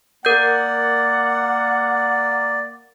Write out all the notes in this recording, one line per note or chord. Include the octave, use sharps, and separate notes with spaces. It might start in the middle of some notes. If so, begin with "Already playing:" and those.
A#3 A#4 D5 F#5 G6